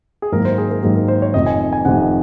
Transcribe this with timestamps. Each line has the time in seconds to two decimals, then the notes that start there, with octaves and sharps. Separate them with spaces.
0.22 G#4
0.32 G#2 D#3 F#3 A#3 A#4
0.45 C5
0.58 G#4
0.71 A#4
0.83 G#2 D#3 F#3 A#3 G#4
0.96 A#4
1.08 C5
1.22 C#5
1.34 F1 F2 C3 D#3 D#5
1.46 G#5
1.73 G#5
1.85 F1 F2 C3 D#3 F#5